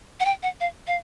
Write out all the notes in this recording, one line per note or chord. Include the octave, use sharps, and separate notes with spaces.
F#5
G5
F#5
F5
F5